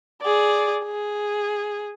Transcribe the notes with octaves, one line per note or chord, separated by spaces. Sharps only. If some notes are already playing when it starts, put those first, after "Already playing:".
G#4 D5
G#4